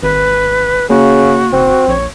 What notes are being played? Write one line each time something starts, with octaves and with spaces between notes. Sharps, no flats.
G#1 B4
C#3 A#3 F#4
F#1 C4
A#1 C#5